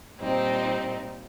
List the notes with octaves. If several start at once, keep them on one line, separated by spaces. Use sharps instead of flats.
A#2 G3 C4 D#4